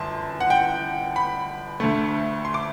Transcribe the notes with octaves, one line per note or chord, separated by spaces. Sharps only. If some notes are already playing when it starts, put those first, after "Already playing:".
Already playing: G1 F#2 E3 A5 C6
F#5
G5
B5
D2 D3 A3
C6
D6